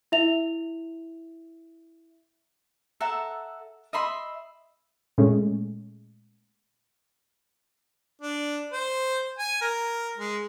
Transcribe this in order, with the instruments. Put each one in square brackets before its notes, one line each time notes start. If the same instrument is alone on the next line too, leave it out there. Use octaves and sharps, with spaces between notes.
[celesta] E4 E5 F7
[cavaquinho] A4 E5 F#5 A#5
D#5 E5 B5 C6
[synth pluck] A#2 G#3 A3 C#4
[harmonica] D4
C5
G#5
A#4
G#3